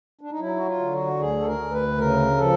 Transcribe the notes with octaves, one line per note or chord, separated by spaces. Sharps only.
D4
D#4
F#3 E4
F#4
F4
D3
F#4
D2 G#4
A4
A#4
D2
B4
C#3 A#4
F3 A4